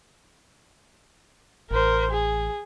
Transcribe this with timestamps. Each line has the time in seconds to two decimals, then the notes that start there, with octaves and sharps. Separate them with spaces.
1.71 A1 A#4 C5
2.11 G#4